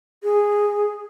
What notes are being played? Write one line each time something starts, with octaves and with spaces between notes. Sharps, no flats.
G#4